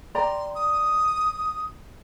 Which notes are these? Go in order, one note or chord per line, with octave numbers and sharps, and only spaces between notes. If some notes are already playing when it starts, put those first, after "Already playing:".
D5 G5 A#5 C6
D#6